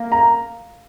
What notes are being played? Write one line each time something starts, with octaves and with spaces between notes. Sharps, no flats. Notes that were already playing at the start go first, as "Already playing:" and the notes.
Already playing: A#3
A#5